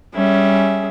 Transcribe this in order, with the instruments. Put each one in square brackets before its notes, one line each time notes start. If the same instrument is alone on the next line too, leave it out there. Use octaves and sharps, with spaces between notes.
[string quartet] G3 C#4 G#4 E5